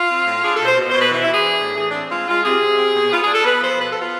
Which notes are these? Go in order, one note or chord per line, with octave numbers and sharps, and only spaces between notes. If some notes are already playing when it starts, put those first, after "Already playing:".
Already playing: F4
C4
A2
D4 G#4
A4
B2
C5
B2
C5
B2
B4
E3
E4
E3
G#4
D4
A2
E3 G#4
D4
C4
G#3 F4
G#3 F4
C3 G#4
C3
C4
B2
B3 F4
D4 G#4
A4
B3 B4
F3 C5
B2 B4
A4
B3
F4